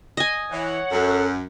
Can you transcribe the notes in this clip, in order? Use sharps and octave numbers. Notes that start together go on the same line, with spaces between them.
D#5 G#5
E3 C#5 F#5
F#2 A4